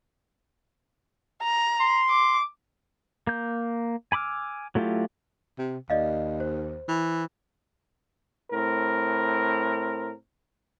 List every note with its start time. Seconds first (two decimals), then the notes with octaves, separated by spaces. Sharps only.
1.43 A#5
1.80 C6
2.09 D6
3.27 A#3 G6
4.12 G#5 B5 D6 E6 F6
4.75 F#3 A3 E4 F4 G4
5.58 C3
5.90 D#2 D5 D#5 F5
6.40 C5
6.88 E3
8.52 A2 C4 A#4